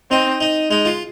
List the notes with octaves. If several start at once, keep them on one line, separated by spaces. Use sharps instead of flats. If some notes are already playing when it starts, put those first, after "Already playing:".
C4 D#4
D#4
G#3 D#4
F4